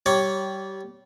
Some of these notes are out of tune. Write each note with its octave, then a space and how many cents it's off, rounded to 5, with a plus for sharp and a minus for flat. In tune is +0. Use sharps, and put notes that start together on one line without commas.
G3 -20 C#5 +0